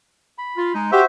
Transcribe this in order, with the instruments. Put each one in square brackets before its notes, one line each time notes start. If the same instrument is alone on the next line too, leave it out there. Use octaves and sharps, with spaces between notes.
[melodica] B5
[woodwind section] F4
G#3 D#4
[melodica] F#4 C5 E5 [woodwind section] G4